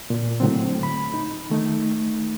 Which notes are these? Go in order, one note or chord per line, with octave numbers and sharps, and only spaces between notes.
A#2
A2 D3 F#3 C4
B5
D#4
D#3 A3 D#4